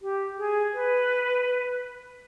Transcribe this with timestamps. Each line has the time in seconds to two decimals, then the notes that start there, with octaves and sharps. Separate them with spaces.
0.02 G4
0.38 G#4
0.74 B4